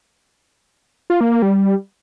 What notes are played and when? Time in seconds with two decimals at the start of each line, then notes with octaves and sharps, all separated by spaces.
1.10 F4
1.21 A#3
1.31 A#3
1.42 G3